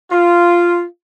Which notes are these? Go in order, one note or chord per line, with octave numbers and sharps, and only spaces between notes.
F4